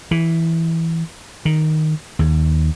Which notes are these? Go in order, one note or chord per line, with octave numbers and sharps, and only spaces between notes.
E3
D#3
D#2